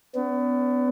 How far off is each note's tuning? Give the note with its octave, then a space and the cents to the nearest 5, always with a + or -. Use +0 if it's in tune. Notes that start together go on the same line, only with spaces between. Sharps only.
B3 +25 D4 -40